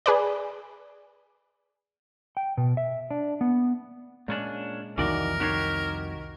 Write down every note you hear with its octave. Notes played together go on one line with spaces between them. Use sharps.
G#4 B4 D5
G5
B2
E5
D4
B3
A#2 G#3 C#4 D4
C2 F2 D#3 E3 F#4 A#4 D5 A#6
D#3 F#4 G4 C#5 G#6 C7